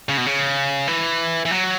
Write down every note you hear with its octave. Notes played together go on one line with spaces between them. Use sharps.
C#3
B2
C#3
E3
E3
F#3